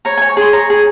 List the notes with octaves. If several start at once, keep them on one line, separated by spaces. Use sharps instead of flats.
C#5 A#5
G#5
C#5
C#6
G#4 C6
C#5 A#5
G#4